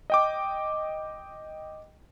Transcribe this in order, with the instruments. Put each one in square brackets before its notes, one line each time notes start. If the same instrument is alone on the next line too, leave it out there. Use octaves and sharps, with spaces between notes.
[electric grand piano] D#5 G5 D6